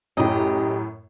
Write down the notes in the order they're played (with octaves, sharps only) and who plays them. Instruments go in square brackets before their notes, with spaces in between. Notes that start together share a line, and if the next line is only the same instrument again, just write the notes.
[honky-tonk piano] F#2 A2 [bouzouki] G4 D#5